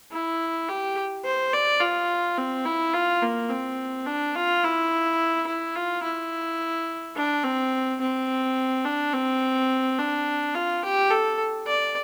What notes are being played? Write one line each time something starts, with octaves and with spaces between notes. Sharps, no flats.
E4
G4
C5
D5
F4
C4
E4
F4
A#3
C4
D4
F4
E4
E4
F4
E4
D4
C4
C4
D4
C4
D4
F4
G4
A4
D5